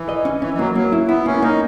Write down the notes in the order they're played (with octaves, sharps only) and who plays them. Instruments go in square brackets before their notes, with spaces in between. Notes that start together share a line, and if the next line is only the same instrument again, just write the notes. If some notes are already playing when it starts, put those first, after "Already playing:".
Already playing: [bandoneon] E3
[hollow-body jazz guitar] D#5
C#4
[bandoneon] E3 [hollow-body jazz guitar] C#4
[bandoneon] E3
[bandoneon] F#3 [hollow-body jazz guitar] A#3
[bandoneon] F#3 [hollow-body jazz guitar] A#3
[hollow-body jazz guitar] E4
[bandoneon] B3 [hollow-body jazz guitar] E4
[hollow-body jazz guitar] A#3 [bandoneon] C#4
[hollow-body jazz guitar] A#3 [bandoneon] D#4